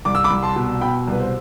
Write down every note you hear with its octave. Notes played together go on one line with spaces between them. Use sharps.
C2 D6
E6
B5 D6
C2
A5 C6
B2
B2 G5 B5
C2 B4
C5